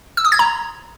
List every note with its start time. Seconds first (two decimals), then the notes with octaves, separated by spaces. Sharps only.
0.17 E6
0.25 D#6
0.32 G#6
0.39 A#5